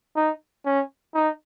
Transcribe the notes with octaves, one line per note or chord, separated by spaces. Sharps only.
D#4
C#4
D#4